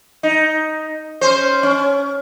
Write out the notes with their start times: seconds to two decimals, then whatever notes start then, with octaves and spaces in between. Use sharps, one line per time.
0.23 D#4
1.21 C#4 C5
1.63 C#4